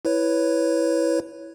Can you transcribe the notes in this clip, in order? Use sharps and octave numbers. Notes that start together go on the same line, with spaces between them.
E4 B4 C#5